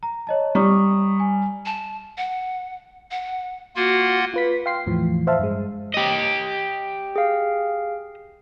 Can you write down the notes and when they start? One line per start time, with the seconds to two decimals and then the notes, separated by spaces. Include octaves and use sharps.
0.03 A#5
0.27 C#5 D#5 A5
0.55 G3 A#5 C#6 D#6
1.20 G#5
1.66 A5
2.18 F#5
3.11 F#5
3.76 A#3 F4 F#4 F#5
4.34 F4 B4 B6
4.66 F5 G5 C6 C7
4.86 E2 A2 E3 F3
5.27 C5 E5 F5 A5
5.39 G2 G#3
5.94 G4 D#5
7.16 G#4 F5